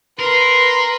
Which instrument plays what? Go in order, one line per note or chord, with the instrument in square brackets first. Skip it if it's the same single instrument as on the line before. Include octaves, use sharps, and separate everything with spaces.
[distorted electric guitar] A#4 [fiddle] B4 [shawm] C6